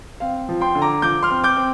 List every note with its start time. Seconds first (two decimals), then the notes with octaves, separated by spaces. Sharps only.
0.20 C4 F5
0.49 F3
0.61 G5 C6
0.75 D3
0.82 A#5 D6
1.02 F3 D6 G6
1.23 C6 F6
1.30 C4
1.44 D6 G6
1.57 C4